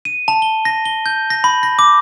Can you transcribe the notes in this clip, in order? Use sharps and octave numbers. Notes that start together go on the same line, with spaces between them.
D#7
A5
G7
A#6
G7
G6
A#6
B5
A#6
D6